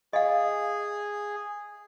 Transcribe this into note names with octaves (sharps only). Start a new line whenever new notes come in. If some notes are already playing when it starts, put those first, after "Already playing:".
G#4 D#5 F5